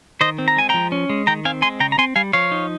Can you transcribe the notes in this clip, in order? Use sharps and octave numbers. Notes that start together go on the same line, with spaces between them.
D#3 C5 D#5
C4
A#5
G#3 G#5
F3 G5 A#5
C#4
G#3
D#3 G5 A#5
C4 F5 G#5
G#3 G#5 C6
C#3 G5 A#5
A#5
C4 G#5 C6
G3 F5 G#5
F3 C#5 F5
D#4